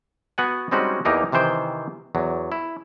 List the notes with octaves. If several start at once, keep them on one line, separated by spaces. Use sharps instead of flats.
B3 F#4 F#5 G#5
G3 G#3 C4 C#4 D#4 F#4
E2 E3 A#3 D#4 G4 A#4
C3 D#3 E3 C5 G5
E2 F#3
E4